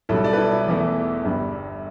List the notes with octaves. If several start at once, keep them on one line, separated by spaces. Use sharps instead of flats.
B1 B2 G3 E4 A4
A4 D5
B4
E4 A4
E4
E1 E2 E3 A3
G1 G2 G3